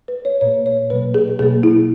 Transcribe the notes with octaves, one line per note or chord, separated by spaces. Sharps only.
B4
C#5
A#2 A#3 C#5
C#5
B2 F#3 A#3 B4
G#4
B2 F#3 A#3 G#4
E4